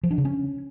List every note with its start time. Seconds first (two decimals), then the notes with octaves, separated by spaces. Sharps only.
0.03 F3
0.11 D4
0.18 C#3
0.25 C#4